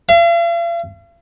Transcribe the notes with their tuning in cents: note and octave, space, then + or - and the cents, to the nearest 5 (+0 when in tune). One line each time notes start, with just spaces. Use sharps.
F5 -45